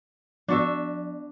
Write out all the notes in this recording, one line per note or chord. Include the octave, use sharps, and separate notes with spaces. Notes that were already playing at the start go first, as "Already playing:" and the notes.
F3 D4 F#4 E5